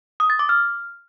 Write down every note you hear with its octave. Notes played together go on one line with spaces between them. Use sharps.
D#6
A6
D6
F6